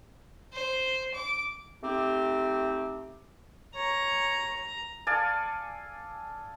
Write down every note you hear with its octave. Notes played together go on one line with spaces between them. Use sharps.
C5
D6
A3 C4 D#4 G4
C#5 A#5
A4 D5 F5 G#5